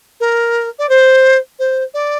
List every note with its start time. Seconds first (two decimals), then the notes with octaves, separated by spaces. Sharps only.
0.20 A#4
0.78 D5
0.89 C5
1.59 C5
1.93 D5